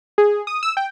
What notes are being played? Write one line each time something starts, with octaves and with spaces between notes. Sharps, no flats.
G#4
D#6
E6
G5